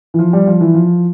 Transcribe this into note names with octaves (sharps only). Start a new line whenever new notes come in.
E3
F3
G3
F3
E3
F3